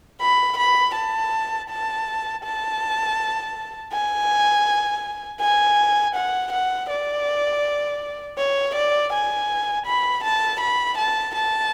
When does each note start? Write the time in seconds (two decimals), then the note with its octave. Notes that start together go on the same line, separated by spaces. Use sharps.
0.21 B5
0.57 B5
0.95 A5
1.69 A5
2.44 A5
3.92 G#5
5.41 G#5
6.15 F#5
6.52 F#5
6.89 D5
8.37 C#5
8.75 D5
9.12 G#5
9.86 B5
10.24 A5
10.60 B5
10.98 A5
11.35 A5